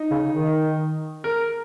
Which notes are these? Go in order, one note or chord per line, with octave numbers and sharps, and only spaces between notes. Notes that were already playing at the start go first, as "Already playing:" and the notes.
Already playing: D#4
C#3
D#3
A#4